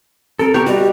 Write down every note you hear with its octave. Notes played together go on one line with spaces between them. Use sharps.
C4 A4 A#4
B3 G4 B4 A#5 C#6
G3 F#4 G4 D5 D#5